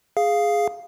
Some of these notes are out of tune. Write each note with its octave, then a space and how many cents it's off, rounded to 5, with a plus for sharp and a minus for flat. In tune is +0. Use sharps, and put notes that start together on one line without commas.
G#4 +0 F5 +0